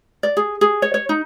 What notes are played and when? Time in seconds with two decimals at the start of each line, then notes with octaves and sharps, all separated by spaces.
0.23 D5
0.37 G#4
0.61 G#4
0.82 C#5
0.94 C#5
1.09 D#4